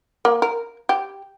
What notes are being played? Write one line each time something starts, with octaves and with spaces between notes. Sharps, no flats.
A#3
A#4
G4